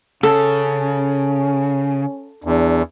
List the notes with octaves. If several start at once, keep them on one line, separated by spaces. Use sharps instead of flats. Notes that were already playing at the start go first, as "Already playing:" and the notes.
C#3 C#4 A4
E2 D4